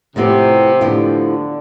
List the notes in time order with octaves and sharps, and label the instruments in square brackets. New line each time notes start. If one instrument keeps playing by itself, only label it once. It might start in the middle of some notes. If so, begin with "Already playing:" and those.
[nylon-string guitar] A2 F3 B3 E4 G4 [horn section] C3
[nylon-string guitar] A2 F3 B3 E4 G4 [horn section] D3